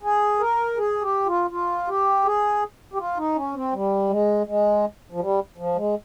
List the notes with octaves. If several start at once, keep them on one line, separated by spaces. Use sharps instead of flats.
G#4
A#4
G#4
G4
F4
F4
G4
G#4
G4
F4
D#4
C#4
C4
G3
G#3
G#3
F3
G3
F3
G#3